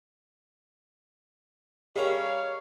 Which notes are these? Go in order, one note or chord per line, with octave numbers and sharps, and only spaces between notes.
G3 C#4 G4 G#4 A#4 C#5 D#5 F5